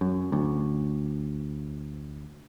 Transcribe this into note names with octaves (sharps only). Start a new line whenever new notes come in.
F#2
D2